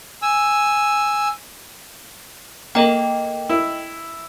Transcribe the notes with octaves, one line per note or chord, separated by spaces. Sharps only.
G#5 E6
A#3 A4 D#5 G5
E4